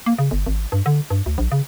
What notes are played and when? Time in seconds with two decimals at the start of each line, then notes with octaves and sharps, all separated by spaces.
0.06 A#3
0.19 C#3
0.31 G1
0.46 G#1
0.72 G2
0.86 D3
1.10 G2
1.26 D2
1.38 A#1
1.52 C#3